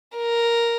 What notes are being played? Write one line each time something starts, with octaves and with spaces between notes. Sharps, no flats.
A#4